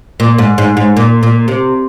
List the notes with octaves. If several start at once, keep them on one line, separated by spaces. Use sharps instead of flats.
A#2
G#2
G#2
G#2
A#2
A#2
C3